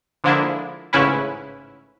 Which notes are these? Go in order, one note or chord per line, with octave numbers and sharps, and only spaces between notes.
D3 F3 G#3 A#3 D4 E4
A1 G#2 C#3 C#4 E4 B4